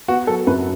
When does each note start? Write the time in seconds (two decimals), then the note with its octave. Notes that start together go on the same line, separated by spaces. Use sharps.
0.08 B3 F#4
0.27 F#3 A4
0.47 F#2 B4